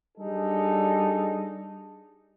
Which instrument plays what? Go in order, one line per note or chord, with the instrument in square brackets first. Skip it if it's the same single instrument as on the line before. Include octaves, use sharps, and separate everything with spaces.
[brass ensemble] G3 D4 D#4 G#4 A4